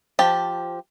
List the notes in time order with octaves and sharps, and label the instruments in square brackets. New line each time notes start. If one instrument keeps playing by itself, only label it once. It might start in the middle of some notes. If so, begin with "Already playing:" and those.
[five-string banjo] F3 G4 A5